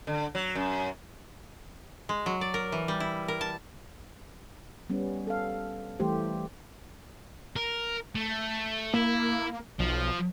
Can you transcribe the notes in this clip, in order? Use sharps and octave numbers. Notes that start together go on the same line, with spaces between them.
D3
F#3
F#2
G#3
F#3
D5
A#4
E3
G3
E4
A#4
A5
G3 B3 C#4
A4 F5
E3 G3 A3 G4 C5
A#4
A3
A#3 E4
B1 F3